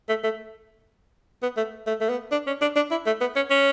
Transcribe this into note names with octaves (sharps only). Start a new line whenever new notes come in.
A3
A3
B3
A3
A3
A3
B3
D4
C#4
D4
D4
E4
A3
B3
C#4
C#4